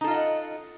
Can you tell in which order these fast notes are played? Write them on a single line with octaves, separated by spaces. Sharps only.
D#4 A4 F4 D#5 F#5